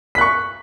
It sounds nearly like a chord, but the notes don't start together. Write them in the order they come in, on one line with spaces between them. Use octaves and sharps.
B6 F#6 C#6